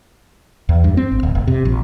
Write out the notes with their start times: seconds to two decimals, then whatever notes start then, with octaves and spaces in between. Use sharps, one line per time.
0.69 E2
0.84 G2
0.97 C4
1.11 G#1
1.23 D1
1.35 F1
1.48 C3
1.65 A#1